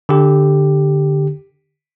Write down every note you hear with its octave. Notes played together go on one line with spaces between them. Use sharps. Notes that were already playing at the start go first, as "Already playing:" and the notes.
D3 G4